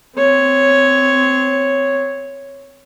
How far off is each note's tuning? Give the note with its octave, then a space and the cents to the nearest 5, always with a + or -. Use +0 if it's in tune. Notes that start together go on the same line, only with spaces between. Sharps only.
C4 -15 C#5 +0